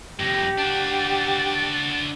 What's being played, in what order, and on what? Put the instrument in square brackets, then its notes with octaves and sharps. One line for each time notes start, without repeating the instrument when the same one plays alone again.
[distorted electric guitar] F2 A2 [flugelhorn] G4 [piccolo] A#6
[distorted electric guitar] D4 F#4 [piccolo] A6